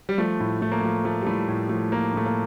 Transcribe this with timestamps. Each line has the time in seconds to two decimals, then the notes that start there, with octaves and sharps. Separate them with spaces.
0.09 G3
0.18 F3 A3
0.40 A2
0.61 A2 A3
0.72 A#3
0.81 F3 A3
1.04 F3 A3
1.22 G3
1.26 A2 A3
1.48 A2
1.69 F3 A3
1.92 F3 A#3
2.14 A2 A3
2.26 A#3